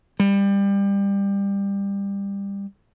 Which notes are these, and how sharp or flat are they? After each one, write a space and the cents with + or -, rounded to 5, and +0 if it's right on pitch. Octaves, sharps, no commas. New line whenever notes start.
G3 +25